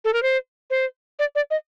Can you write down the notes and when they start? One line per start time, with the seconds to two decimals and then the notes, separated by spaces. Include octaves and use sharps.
0.05 A4
0.13 A#4
0.23 C5
0.70 C5
1.19 D5
1.35 D5
1.51 D#5